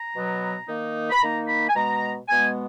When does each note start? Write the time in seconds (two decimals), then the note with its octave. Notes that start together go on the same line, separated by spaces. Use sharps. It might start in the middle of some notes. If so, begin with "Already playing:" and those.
Already playing: A#5
0.13 B2 F#3 B3
0.67 D#3 A#3 D#4
1.10 B5
1.20 D#3 A#3 D#4 A#5
1.48 B5
1.69 G#5
1.75 B2 G#3 B3 A#5
2.28 B2 G#3 B3 G#5